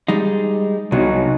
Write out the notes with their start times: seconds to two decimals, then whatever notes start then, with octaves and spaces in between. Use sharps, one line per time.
0.08 G3 G#3 D#4
0.92 C2 B2 F#3 D#4